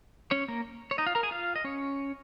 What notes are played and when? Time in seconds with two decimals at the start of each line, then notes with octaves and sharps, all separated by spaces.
0.31 C#4 C#5
0.48 A#3 A#4
0.91 C#5
0.98 D#4 D#5
1.06 F4 F5
1.15 A#4 A#5
1.23 G#4 G#5
1.31 F4 F5
1.56 D#5
1.64 C#4 C#5